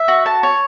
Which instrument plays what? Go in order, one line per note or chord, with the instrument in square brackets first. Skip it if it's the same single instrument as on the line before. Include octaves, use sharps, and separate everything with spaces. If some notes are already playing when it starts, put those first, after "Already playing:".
Already playing: [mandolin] E5
F#4
A5
C#5